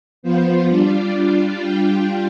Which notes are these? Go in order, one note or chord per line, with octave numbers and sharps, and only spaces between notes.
F3 B3 F4 C5
G3 D4 F4 D5
G3 D4 F4
G3 D4 F4 G5